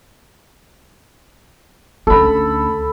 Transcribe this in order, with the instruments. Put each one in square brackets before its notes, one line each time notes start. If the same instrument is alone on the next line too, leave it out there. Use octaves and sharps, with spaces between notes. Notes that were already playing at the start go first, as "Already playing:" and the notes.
[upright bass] D2 C#4 [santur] A4 B5